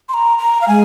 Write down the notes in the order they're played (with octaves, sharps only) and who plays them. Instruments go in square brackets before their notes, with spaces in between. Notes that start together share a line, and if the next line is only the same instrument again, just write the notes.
[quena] C6
A#5
A#5
F5
[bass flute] G#3 [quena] G#5